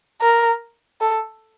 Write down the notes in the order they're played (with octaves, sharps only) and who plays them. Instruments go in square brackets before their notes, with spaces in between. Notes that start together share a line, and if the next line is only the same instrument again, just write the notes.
[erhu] A#4
A4